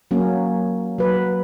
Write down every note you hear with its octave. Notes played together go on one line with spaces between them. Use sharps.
F#3 A#3 C#4
F#3 B4